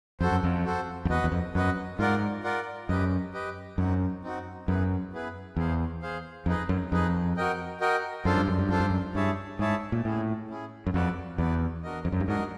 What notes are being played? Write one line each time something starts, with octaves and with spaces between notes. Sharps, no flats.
F2 F#4 A4 C5
F#2
F2
F#4 A4 C5
F2
E2 F#4 B4 D#5
E2
F2
F#2 F#4 B4 D#5
G#2 F4 A#4 D5 F#5
F4 A#4 D5 F#5
F#2 G4 B4 D#5
G4 B4 D#5
F#2 C4 D#4 F#4
C4 D#4 F#4
F#2 B3 E4 G#4 B4
B3 E4 G#4 B4
E2 G#4 C5 F5
G#4 C5 F5
F2 D#4 G#4 B4 D#5
F#2
F2 D#4 G#4 B4 D#5
F#4 A#4 D#5 G5
F#4 A#4 D#5 G5
F#2 D4 F4 A4 C5 F5
G2
F#2
G2
F#2 D4 F4 A4 C5 F5
G2
F#2
G2 E4 G#4 C#5 E5 A5
G#2 E4 G#4 C#5 E5 A5
A#2
A2 C#4 E4 G#4
C#4 E4 G#4
F#2
F2 F#4 B4 D5
E2 F#4 B4 D5
D4 F#4 A#4 D#5
F2
F#2
G2
G#2 D4 F#4 A#4 D#5